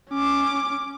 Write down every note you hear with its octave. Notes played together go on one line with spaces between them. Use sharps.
C#4 D6